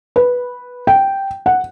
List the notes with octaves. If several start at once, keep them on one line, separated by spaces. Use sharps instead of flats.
B4
G5
F#5